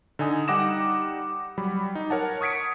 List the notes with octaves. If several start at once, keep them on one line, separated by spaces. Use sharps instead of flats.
D3 D#4 G#5 D#6
G3 D#4 F#5 D6 A#6 E7
F#3 G3 B5
D#4
A#4 C#5 F#5 A5
C#6 D#6 G#6 B6 C#7 D7